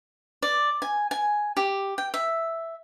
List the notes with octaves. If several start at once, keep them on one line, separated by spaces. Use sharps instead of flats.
D5
G#5
G#5
G4
G5
E5